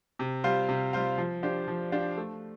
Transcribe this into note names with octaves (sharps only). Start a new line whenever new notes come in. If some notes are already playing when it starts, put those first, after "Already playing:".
C3
G3 F4 C5 F5
C3
G3 F4 C5 F5
F3
D4 G4 C5 F5
F3
D4 G4 C5 F5
A3